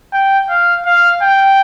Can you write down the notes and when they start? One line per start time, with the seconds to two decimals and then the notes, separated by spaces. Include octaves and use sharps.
0.13 G5
0.50 F5
0.86 F5
1.22 G5